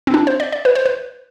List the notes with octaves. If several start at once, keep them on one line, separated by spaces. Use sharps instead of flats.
C4
D4
C5
D5
D5
B4
C5
B4